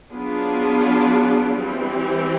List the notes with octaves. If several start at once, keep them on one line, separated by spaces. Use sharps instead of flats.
F#3 B3 D4 F4 G#4
E3 G3 C4